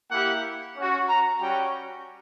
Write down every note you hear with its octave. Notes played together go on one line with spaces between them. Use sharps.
A#3 E4 G4 F#5
C#4 F#4
A#5
G3 C#4 F#4 G5